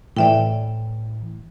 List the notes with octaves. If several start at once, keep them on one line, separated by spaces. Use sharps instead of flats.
A2 E3 D5 E5 G5